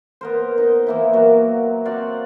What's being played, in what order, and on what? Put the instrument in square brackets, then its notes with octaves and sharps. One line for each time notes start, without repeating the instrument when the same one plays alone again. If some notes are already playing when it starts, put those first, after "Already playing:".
[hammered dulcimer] B3 A#4 C5
D#4 D#5
E3 A#3 E4
F#3 A#3
C4 F#4 D5 F5